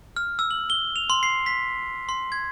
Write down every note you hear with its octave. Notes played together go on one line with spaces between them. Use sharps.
F6
E6
F#7
G7
F7
C6
C7
B6
C6
G#6